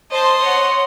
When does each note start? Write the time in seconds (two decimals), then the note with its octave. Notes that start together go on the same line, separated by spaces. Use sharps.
0.11 C5 D#5 A5 C6
0.40 C#5 F#5